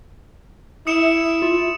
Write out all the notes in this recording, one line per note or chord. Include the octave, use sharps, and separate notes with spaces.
E4 D#6 C#7 E7
F4